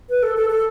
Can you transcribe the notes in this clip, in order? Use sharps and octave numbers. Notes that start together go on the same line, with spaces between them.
B4
A4
A4
A4